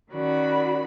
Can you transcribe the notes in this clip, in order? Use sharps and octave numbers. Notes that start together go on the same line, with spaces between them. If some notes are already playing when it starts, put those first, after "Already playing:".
D#3 C#4 F#4 D5 B5